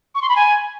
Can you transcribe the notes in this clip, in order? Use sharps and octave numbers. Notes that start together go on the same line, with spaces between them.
C#6
C6
B5
G#5